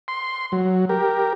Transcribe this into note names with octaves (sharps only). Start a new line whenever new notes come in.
C6
F#3
G4 A#4